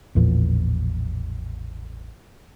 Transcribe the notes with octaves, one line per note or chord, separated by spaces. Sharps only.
A1 E2 A#2 F3